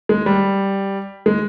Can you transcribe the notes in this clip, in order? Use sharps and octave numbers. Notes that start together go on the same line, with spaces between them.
G#3
G3
G#3